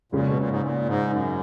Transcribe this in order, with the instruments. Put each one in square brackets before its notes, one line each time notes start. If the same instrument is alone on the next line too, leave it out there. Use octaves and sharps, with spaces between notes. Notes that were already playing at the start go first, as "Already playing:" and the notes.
[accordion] A#2 [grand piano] C#3 G#3 C#4
[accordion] B2
A#2
G#2
A#2
G#2
F#2